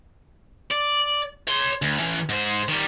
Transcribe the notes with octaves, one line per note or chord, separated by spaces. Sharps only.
D5
C#5 C6
D2
E3 C#4
G#2 C5
D#3 G3